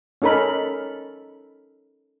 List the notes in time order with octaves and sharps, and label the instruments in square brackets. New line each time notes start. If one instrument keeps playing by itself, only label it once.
[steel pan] C#4 D#4 A4 A#4 B5